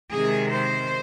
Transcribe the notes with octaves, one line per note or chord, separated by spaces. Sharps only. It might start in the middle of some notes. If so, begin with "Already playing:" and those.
C3 D#3 G#3 G#4
C5